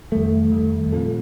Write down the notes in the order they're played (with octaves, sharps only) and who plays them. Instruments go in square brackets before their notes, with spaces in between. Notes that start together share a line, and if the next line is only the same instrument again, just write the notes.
[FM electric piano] F2 D#3 G3 [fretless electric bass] A3
[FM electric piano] F2 D#3 G3
A#2 F3 C4 F4 A4